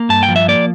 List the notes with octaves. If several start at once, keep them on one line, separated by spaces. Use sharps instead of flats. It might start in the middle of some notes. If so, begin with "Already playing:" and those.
Already playing: A#3
G2 A5
G5
F3
E5
A#3 D5